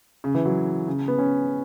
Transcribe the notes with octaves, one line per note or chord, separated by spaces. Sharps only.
C#3
E3
F#3
C#3
B3
C#4